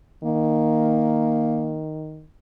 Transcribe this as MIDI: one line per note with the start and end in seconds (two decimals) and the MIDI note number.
0.23 2.26 51
0.23 1.84 58